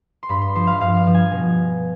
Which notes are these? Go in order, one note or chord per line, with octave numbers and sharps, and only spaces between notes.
C6
G2 B5
C6
F3 C6
F5
G2 F5
F5
F3
G#5
B2